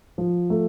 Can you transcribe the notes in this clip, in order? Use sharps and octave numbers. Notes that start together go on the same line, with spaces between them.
F3
A3